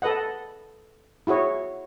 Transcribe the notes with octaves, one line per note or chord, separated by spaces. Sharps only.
A4 B4 D#5 F#5
E4 F#4 G#4 C#5